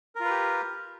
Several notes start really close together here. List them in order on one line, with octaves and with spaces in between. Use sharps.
A#4 F4 B4 G4